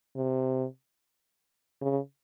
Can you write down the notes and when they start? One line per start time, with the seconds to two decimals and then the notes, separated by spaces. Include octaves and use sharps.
0.16 C3
1.82 C#3